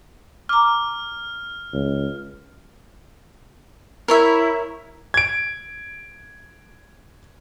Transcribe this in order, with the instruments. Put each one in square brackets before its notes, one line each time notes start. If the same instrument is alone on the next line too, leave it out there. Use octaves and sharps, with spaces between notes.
[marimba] A#5 D6 [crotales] F6
[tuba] C#2
[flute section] E4 [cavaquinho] A#4 C#5 E5
[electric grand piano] G#6 D7